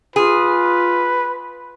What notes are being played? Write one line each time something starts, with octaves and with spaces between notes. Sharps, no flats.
F4 G#4 B4